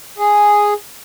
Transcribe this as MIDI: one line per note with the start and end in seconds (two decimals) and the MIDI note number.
0.18 0.74 68